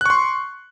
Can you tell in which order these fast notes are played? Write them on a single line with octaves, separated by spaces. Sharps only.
F#6 C#6 C6